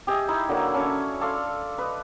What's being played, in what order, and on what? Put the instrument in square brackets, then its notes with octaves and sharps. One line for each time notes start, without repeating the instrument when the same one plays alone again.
[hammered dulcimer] G4 G#4 D#5 E5
D#4 E4 B5
D3 F#3 A#3
C#4 A4 C#5
A4 D5 F5 C6
B4 D#5